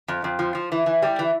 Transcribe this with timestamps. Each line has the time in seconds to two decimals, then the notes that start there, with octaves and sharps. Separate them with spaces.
0.08 F2
0.24 F2
0.39 F3
0.55 F3
0.72 E3
0.86 E3
1.02 G3
1.19 E3